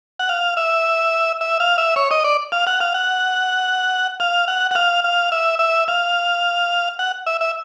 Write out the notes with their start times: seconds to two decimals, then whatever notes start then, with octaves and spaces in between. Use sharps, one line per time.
0.19 F#5
0.29 F5
0.57 E5
1.41 E5
1.60 F5
1.78 E5
1.96 C#5
2.11 D#5
2.24 D5
2.52 F5
2.67 F#5
2.80 F5
2.94 F#5
4.20 F5
4.48 F#5
4.71 F#5
4.75 F5
5.04 F5
5.32 E5
5.59 E5
5.88 F5
6.99 F#5
7.27 E5
7.41 E5